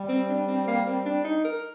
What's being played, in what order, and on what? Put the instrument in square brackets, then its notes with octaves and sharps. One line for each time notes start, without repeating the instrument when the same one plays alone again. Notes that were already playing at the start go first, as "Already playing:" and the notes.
Already playing: [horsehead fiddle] G3
[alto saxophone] C4
D4
C4
A#3
C4
D4
D#4
A#4